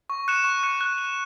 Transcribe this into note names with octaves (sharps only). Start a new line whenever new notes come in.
C#6
F#6 C#7 E7
C#6
F#6 C#7 E7
F#6
E7